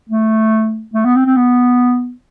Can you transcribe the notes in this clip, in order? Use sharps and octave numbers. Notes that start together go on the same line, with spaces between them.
A3
A3
B3
C4
C4
B3